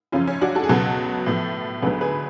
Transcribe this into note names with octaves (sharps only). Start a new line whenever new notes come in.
F#2 C#3 F3 C#4 F4
C#4
D4 F#4
F#4 A4
G#4
C#2 B2 F#3 B3 F#4 A4
A2 F3 B3
D2 D3 F#3 B3 G#4 B4
G#4 B4